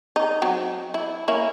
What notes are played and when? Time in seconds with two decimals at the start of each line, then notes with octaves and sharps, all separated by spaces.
0.16 D#4
0.42 F#3 C4 D#4
0.94 E4
1.28 A#3 C#4 E4